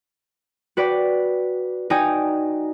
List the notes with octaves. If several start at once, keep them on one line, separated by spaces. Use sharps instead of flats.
F#4 B4 D5 G5 D6
D#4 F#4 D5 G5 G#5 D#6